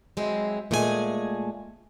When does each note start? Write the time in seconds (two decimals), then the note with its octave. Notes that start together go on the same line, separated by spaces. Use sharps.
0.17 F#3 G#3 C4 E4
0.71 A#2 G#3 A3 G#4 A4 G#5